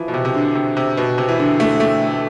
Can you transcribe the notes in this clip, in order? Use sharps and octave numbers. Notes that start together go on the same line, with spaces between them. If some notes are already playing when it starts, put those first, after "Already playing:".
Already playing: E3 F3
B2
C3
C3
D3
C3
C3
B2
C3
E3
D3
A3
A3